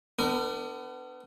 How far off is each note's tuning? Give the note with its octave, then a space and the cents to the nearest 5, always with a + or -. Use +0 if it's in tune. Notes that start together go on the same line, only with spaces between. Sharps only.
B3 +30 D4 +15 A#4 -35